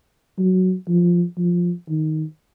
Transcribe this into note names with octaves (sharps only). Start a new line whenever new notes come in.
F#3
F3
F3
D#3